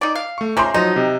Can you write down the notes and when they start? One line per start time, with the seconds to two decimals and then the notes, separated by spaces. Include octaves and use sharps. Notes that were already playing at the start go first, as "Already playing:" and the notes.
0.01 D#4 D5
0.15 F5
0.38 A3 C#6
0.57 C#3 F3 E5 A#5 C6 D6 G6
0.74 F3 F#3 D#4 D#5
0.96 C3